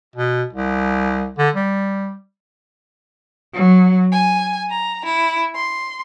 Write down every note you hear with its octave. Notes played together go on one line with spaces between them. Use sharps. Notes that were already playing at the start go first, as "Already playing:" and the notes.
B2
C2
D3
G3
F#3
G#5
A#5
E4
C6